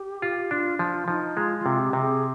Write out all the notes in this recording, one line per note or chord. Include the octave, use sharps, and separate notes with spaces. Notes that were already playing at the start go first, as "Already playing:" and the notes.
Already playing: G4
F4
D4 F4
F3 F4
F3 D#4
G#3 F4
F4
C3
G4
C3
G#4